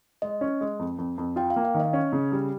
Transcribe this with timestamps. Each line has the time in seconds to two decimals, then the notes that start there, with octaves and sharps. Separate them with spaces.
0.22 G#3 D#5
0.41 C#4
0.61 G#3
0.79 F2
0.98 F2
1.18 F2
1.36 F4 G5
1.50 F5
1.56 A#3
1.65 F5
1.74 D#3
1.80 D#5
1.93 C#4
2.13 C#3
2.32 G3